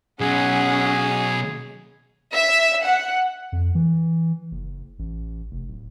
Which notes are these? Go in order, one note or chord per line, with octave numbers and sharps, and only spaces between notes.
B2 F#3 C#4 G#4 F#5
E5
F#5
F2
E3
F#1
A1
F1
D1